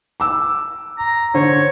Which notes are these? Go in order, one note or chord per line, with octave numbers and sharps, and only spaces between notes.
D6 E6
A#5
D3 C5 C#5